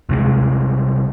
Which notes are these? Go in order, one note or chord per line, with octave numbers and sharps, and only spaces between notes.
C2 C3 E3 G#3